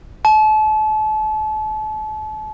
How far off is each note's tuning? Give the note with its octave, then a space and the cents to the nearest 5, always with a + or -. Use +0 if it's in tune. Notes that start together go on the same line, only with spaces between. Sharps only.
A5 -35